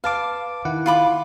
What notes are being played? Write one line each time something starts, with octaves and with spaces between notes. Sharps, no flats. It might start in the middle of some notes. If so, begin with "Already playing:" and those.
B4 F5 A5 D6
D#3 E4 F#5
F4 B5 D6